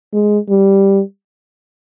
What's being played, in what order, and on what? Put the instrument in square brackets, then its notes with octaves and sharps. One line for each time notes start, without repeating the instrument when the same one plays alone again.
[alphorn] G#3
G3